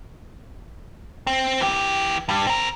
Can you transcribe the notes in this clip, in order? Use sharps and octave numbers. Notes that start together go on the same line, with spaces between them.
C4
E3 G4
G2 G3
C4 A#4